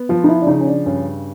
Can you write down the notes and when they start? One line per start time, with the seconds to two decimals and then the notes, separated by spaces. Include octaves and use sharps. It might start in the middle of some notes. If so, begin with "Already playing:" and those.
Already playing: B3
0.09 F3 F4
0.24 D#4
0.29 E4
0.42 D4
0.47 C#3 D#4
0.61 C#4
0.67 D4
0.86 G2 C#4